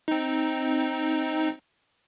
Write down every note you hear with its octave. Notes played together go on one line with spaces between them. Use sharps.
C4 D#4